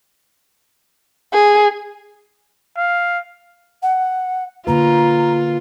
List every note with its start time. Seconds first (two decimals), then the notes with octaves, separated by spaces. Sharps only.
1.33 G#4
2.77 F5
3.82 F#5
4.67 D3 A#3 F4 B4 A#5